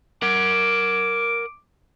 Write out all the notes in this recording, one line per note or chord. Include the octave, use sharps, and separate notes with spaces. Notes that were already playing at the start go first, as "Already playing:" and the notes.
A#4 F#5 D6